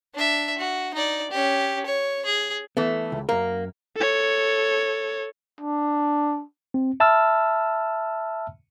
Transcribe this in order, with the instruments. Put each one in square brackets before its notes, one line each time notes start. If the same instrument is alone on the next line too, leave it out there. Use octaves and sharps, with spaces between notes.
[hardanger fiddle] D4 E5
F#4
D#4 D5
C#4 G4
C#5
G#4
[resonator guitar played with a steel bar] E3 A3 [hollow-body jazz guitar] B3
[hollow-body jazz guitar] C#2
[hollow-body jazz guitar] F#2 A#4 [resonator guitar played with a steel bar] A#3
[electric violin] A4 C#5
[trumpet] D4
[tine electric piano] C4
E5 A5 B5 E6 F6